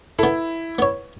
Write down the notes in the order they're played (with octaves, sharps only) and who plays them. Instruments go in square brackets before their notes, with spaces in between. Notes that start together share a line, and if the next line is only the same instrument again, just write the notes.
[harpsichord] B3 A4 [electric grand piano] E4
[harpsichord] B3 C#5